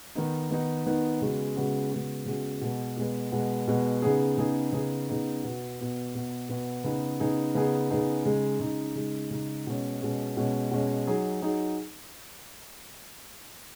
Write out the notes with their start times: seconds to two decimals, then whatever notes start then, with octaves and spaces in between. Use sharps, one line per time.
0.15 D#3 B3 D#4
0.51 D#3 B3 D#4
0.86 D#3 B3 D#4
1.21 C#3 G#3 B3 F#4
1.56 C#3 G#3 B3 F#4
1.92 C#3 G#3 B3 F#4
2.26 C#3 G#3 B3 F#4
2.61 B2 G#3 B3
2.97 B2 G#3 B3
3.32 B2 G#3 B3
3.68 B2 G#3 B3
4.02 C#3 B3 D#4 G#4
4.38 C#3 B3 D#4 G#4
4.73 C#3 B3 D#4 G#4
5.09 C#3 B3 D#4 G#4
5.43 B2 B3 F#4
5.78 B2 B3 F#4
6.15 B2 B3 F#4
6.49 B2 B3 F#4
6.84 C#3 B3 D#4 G#4
7.20 C#3 B3 D#4 G#4
7.55 C#3 B3 D#4 G#4
7.90 C#3 B3 D#4 G#4
8.25 C#3 G#3 D#4
8.60 C#3 G#3 D#4
8.95 C#3 G#3 D#4
9.31 C#3 G#3 D#4
9.67 B2 G#3 C#4
10.02 B2 G#3 C#4
10.37 B2 G#3 C#4
10.71 B2 G#3 C#4
11.07 F#3 D#4 G#4
11.42 F#3 D#4 G#4